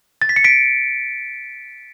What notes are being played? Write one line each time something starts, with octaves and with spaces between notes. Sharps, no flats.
A6
B6
C#7
B6 D7